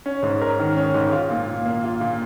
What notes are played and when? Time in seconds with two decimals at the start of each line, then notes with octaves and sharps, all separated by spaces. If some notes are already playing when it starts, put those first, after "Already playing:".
0.06 C#4
0.22 G#2
0.41 A#4
0.59 D#3
0.76 C#4
0.94 G#2
1.12 F4
1.30 A#2
1.47 A#2
1.66 A#3
1.84 F4
2.01 A#2